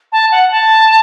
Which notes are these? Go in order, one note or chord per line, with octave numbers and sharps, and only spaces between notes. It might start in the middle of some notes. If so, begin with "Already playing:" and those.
A5
F#5
A5